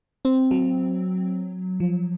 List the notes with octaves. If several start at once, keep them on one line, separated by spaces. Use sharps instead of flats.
C4
F#3
F3